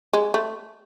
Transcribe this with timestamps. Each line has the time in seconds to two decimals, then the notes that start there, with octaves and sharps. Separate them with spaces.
0.13 G#3
0.34 A3